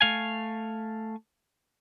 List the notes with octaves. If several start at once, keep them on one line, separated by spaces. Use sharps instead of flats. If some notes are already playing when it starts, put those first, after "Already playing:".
A3 F5 G#5